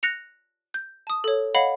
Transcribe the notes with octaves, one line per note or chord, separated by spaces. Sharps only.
F#6 A#6 C#7 F7
G6
A5 D#6
A4 C#5
C#5 D#5 F5 F#5 B5